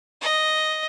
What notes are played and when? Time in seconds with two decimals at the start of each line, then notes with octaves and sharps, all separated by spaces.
0.21 D#5